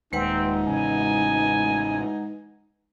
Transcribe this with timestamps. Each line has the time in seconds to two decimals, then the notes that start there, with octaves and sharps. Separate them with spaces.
0.13 D#1 D#2 G#3 C4 D#4 B4 F#5
0.68 A1 C#3 G#5